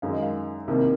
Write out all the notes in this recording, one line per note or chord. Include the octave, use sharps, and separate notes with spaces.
F#2 D#3 G#3 F5
D#5
F5
C2 C3 D#3 A#3